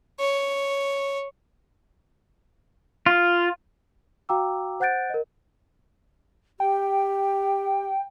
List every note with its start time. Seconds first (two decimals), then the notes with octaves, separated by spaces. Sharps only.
0.20 C#5
3.06 F4
4.29 F#4 F5 G5 A#5 D6 E6
4.80 C5 F#5 F#6 G6 A6 D7
5.10 A#4 D#5
6.60 G4 G5